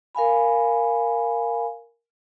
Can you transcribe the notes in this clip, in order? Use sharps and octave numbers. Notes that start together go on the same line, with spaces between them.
A#4 F5 G#5 B5